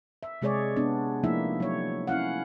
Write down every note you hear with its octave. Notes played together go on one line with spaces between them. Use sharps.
E5
C3 G#3 G#4 C#5 D5
B3 D4
F3 A3 A#3 D#4 E4 E5
F#3 C#5
C#4 E4 F5 F#5